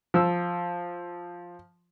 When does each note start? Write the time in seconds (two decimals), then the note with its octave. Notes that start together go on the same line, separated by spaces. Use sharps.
0.14 F3 E6